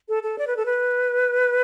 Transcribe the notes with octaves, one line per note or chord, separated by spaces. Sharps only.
A4
A4
D5
B4
A4
B4